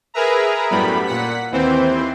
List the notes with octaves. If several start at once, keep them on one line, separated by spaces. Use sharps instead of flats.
G#4 A#4 B4 E5 A#5
F#2 A2 G3 B3 B5
A#2 F#5 B6
D#2 E3 C4 C5